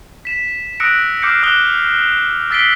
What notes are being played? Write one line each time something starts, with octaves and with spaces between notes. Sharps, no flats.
B6 E7
D#6 E6 F#6 A#6 C#7 D7
D6 F6 G6 C7 C#7
D6 D#6 F#6 G7
E6 A6 B6 C7 D7 G7